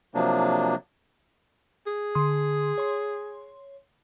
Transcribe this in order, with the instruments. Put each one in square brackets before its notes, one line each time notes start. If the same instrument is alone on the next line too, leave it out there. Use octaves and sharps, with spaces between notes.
[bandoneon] C3 F3 F#3 A#3 D4
[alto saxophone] G#4
[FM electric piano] D3 C6 D#6
C#5 C6